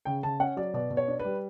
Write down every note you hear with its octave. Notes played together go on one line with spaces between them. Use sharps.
C#3 G5
C#3 A5
C#4 F#5
F#3 D5
B2 D5
B2
C#5
D4
B4
G3